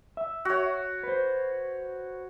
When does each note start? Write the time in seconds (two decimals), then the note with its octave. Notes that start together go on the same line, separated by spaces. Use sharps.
0.17 E5
0.45 F#4 C#5
1.03 B4 C5